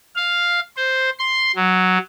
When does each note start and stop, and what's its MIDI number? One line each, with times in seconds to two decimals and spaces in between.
0.16 0.60 77
0.77 1.10 72
1.19 1.52 84
1.56 1.98 54